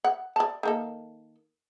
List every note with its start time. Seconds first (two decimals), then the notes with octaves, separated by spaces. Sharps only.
0.04 F#5
0.36 D5 A5
0.63 D#3 A#3 A4